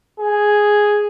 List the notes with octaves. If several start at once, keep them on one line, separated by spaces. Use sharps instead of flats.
G#4